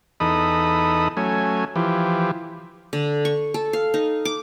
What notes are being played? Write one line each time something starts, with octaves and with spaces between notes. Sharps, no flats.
E2 D#4 A4 B5 D#6
F#3 A3 C#4 G#5
E3 F3 G4
D3
C#6
A4
F5
D#4
D6